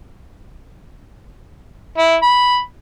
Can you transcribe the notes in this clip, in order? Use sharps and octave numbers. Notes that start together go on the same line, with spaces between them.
E4
B5